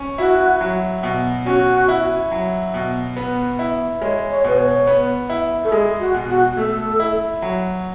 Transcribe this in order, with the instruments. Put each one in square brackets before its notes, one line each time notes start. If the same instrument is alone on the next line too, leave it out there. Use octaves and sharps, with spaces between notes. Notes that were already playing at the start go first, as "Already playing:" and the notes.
Already playing: [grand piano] C#4
[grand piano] E4 [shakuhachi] F#4
[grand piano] F#3
B2
[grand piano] C#4 [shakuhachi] F#4
[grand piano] E4
F#3
B2
B3
E4
[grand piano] G#3 [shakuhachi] C#5
[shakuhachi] C#5
[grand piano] B2 [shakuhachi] B4
[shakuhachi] C#5
[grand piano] B3
E4
[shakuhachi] A4
[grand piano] G#3 [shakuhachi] G#4
[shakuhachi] F#4
[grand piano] B2
[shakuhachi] F#4
[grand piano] A3 [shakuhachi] A4
[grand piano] E4
F#3